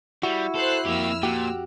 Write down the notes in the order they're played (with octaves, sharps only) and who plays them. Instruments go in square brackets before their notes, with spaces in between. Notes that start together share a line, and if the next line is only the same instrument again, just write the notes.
[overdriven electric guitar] G3 [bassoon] E4 [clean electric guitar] F#4
[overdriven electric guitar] A4 [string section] C5 F#6 C7
[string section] F2 E6 F6 [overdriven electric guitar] A#3 G4
[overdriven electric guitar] A#2 [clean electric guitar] F#4 G4